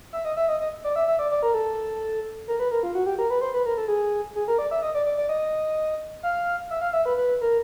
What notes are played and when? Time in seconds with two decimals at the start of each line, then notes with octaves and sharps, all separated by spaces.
0.13 E5
0.25 D#5
0.37 E5
0.49 D#5
0.60 D#5
0.84 D5
0.96 E5
1.07 E5
1.19 D5
1.31 D5
1.43 A#4
1.54 A4
2.48 A#4
2.59 B4
2.71 A#4
2.83 F4
2.95 F#4
3.06 G4
3.19 A#4
3.30 B4
3.41 C5
3.54 B4
3.66 A#4
3.77 A4
3.88 G#4
4.36 G#4
4.48 A#4
4.59 D5
4.71 E5
4.83 D#5
4.95 D5
5.06 D5
5.17 D5
5.29 D#5
6.23 F5
6.70 E5
6.81 F5
6.93 E5
7.05 B4
7.17 B4
7.41 A#4